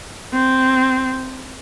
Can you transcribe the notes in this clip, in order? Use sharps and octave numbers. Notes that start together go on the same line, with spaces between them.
C4